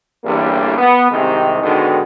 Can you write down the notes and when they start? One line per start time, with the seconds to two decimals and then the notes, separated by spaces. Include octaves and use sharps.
0.25 A1 E2 G2 D3 G3 A#3
0.78 B3
1.11 C2 G#2 C3 D#3
1.63 G#2 B2 D3 D#3